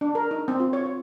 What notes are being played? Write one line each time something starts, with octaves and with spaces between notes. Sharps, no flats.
D4
A#4
D#4
C4
F4
C#5
F4